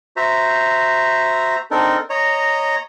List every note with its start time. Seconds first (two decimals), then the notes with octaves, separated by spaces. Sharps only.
0.17 F#4 C5 E5 A#5
1.71 C4 D4 D#4 A4 A#4
2.10 C#5 D#5 A#5